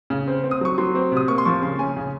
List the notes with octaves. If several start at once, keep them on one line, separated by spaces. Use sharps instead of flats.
C#3
C4
C4
D#6
F#3 C#6
F#3 C6
C4
C3 D#6
A#3 C#6
C6
F3 C#6
C#3 C6
C#4 G#5
C#3